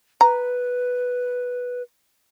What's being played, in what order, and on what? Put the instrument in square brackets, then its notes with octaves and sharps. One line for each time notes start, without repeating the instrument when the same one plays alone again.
[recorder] B4 [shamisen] A#5